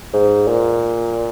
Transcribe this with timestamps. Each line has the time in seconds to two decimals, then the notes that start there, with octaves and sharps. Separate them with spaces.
0.14 G#2
0.48 A#2